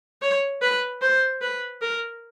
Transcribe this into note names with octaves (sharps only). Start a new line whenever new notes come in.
C#5
B4
C5
B4
A#4